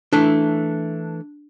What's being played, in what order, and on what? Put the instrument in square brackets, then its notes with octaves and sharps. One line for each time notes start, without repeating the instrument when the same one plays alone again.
[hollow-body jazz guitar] E3 A3 [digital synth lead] D4